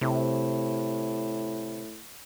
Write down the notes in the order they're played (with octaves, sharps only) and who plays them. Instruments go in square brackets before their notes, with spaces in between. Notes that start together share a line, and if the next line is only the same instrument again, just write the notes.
[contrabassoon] A2 [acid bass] C3